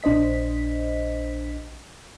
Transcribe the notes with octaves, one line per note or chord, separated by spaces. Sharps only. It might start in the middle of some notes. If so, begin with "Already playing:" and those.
A#1 D4 C5 D#5 B6